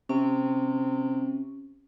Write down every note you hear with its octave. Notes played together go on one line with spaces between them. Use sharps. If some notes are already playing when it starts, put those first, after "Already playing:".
C3 C#4